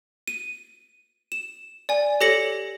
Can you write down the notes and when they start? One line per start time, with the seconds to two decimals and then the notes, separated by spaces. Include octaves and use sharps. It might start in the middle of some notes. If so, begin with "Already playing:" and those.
0.28 D#7
1.32 E7
1.89 D5 G#5
2.21 G4 A4 C#5 A#6 C#7 F#7